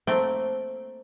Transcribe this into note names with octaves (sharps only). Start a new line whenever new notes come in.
A3 A#3 C4 G5